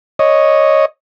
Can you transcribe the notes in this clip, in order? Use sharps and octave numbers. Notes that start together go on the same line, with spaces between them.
C#5 D#5